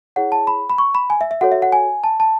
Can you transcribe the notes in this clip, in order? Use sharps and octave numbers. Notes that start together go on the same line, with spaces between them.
E4 G#4 C#5 F#5
A5
B5
B5
C#6
B5
G#5
E5
E5
F#4 A4 C#5 F#5
E5
F#5
G#5
A5
A5